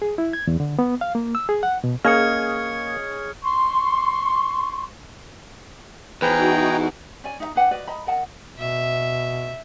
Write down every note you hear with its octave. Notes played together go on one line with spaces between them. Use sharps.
G#4
E4
G#6
E2
D3
B3
F5
A#3
E6
G#4
F#5
B2
A#3 C#4 G#4 D#5 F6 G#6 C#7
C6 C#6
E2 D#4 F#4 G#4 B4 C5 G5 A#5
C#4 D5 G#5
D#4 E5 A#5
D4 B4 F#5 G5
F#4 B4 D5 D#5
D#5 A#5 B5
A#4 D#5 F#5 A5
B2 E5